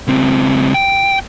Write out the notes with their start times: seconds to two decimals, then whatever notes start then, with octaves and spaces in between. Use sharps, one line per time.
0.07 C#2 C4
0.74 G5